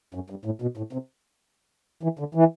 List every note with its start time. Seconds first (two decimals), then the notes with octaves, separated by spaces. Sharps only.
0.14 F#2
0.30 G2
0.45 A2
0.62 B2
0.77 A2
0.93 C3
2.03 E3
2.19 D3
2.35 E3